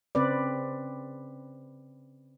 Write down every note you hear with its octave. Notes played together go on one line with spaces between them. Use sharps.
C#3 C4 B4 D5